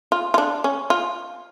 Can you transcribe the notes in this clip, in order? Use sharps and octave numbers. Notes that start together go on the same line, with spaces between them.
F4
F4
D4
C#4
F4